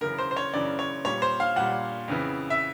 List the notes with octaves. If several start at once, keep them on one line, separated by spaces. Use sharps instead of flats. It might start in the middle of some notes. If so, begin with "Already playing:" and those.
F#2 C#3 E3 A#4
C5
C5
C#5
F#2 C#3 E3 D5
C#5
A#2 G3 C#5
C5
F5
A#2 G3 F#5
F2 C#3 E3
E5